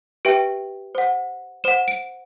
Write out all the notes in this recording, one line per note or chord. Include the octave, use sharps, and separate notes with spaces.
G4 B4 E5 G5 D7
C5 F#5
C5 F#5 E7
D7